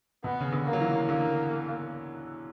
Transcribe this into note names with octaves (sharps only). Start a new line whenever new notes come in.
B2 B3
C#3
D3
A#3
F#3
E3
D3 A#3